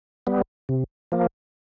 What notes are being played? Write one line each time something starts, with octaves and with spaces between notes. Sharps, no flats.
G3 B3
C3
F3 A#3